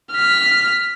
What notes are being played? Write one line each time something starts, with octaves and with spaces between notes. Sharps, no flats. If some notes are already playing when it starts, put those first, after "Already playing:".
F6 B6